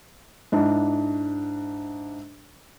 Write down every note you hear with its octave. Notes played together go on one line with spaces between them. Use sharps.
G#2 D4 E4